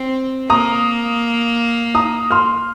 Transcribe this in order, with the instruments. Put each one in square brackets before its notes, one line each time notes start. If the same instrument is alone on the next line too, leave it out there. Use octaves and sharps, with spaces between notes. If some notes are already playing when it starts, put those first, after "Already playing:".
Already playing: [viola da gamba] C4
[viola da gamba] A#3 [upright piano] A#5 D#6
[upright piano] A#5 D#6
C6 F6